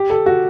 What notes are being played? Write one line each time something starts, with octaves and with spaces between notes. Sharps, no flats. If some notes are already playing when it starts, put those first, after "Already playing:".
Already playing: G4
A4
F#4